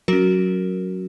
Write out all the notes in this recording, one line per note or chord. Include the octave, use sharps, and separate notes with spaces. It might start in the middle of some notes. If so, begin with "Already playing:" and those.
F#3 C#4 F#4 A#4